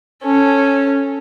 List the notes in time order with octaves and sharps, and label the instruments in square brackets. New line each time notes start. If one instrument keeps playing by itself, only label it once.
[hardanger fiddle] C#4 A4